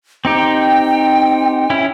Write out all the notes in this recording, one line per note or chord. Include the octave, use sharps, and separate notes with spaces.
C4 D#4 G4 G5
C#4 E4